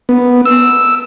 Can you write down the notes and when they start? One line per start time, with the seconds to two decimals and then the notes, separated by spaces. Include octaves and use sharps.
0.09 B3
0.45 E6